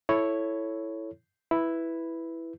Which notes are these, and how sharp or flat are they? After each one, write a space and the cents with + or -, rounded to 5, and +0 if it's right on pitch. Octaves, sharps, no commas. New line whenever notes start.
E4 +0 A4 +0 C#5 +0
E4 +0 B4 +0